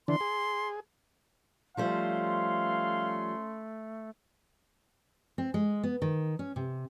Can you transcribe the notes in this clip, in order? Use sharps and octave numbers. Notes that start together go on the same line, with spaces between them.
D3 E3 D4 C6
G#4
F3 G3 A3 C#4 C5 F5 C6
C4
G#3
B3
D#3
C#4
C3